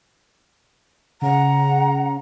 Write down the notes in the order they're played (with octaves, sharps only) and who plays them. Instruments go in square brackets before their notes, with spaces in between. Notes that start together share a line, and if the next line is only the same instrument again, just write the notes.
[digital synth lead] C#3 [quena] F#5 [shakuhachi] A#5